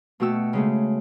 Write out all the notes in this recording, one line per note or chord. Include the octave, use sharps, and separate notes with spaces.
B2 A3 F#4 G4 C#6 E6
C#3 G#3 A3